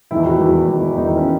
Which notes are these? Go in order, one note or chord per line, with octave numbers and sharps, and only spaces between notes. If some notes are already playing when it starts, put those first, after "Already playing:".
E2 D#3 E4
F#4
E2 D#3
E2 D#3
E2 D#3 D#4
C#4